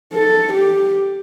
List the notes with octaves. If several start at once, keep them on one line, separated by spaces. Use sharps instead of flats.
A4
G4